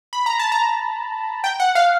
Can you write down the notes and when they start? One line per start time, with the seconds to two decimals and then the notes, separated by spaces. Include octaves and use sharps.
0.13 B5
0.26 A#5
0.39 A5
0.52 A#5
1.44 G5
1.60 F#5
1.75 F5